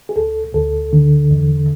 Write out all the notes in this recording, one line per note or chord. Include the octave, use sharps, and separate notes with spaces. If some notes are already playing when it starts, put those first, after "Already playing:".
G#4
D2 A4
D2 A4
D3
E2